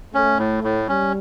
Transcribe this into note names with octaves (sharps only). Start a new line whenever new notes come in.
A3 C#4
A2
A2
G3 C#4